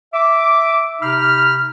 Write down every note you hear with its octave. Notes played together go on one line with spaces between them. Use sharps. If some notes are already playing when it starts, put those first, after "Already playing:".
E5 D6
C3 D#4 B5 F6